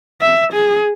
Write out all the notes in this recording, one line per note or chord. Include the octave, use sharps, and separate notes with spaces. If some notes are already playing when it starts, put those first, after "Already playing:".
E5
G#4